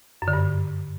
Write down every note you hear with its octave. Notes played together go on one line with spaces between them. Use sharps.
F#2
D3
G2